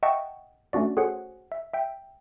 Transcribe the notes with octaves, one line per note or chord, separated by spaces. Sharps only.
D#5 E5 F#5 G5 A5 C#6
A3 C#4 D4 F#4 D5
F#4 G#4 A4 C5 C#5 F#5
E5
E5 G5